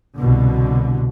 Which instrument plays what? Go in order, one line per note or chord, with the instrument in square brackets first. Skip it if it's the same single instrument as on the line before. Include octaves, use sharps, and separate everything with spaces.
[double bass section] C2 B2 D3